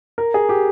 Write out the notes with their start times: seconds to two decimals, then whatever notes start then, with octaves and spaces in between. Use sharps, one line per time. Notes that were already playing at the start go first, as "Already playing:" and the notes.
0.18 A#4
0.34 G#4
0.49 G4